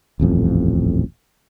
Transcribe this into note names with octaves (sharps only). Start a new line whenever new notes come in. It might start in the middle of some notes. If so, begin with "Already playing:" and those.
D#1 A1 F2